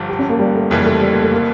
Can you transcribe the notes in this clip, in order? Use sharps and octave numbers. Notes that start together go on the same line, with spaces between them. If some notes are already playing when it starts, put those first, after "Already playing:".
Already playing: G1 G2 F3
G4
C#4
A#3
G3
A3
F1 F2 C#3 E3 A#3
G3
A3
G3
A#3
A3
A#3